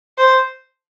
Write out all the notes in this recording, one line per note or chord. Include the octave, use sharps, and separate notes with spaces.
C5